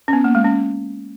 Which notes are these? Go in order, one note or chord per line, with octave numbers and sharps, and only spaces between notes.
C#4
B3
A#3
G#3
C#4